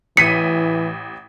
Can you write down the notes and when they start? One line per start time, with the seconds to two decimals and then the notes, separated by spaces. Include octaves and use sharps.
0.17 A1 E3 B6 C#7 D#7